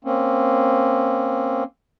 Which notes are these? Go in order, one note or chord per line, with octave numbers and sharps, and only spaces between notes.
A#3 C4 C#4